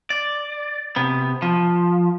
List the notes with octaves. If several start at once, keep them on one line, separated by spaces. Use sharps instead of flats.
D5
C3 B3
F3